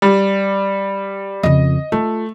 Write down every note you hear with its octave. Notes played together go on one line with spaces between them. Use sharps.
G3
F2 C#3 D#5
A3 F4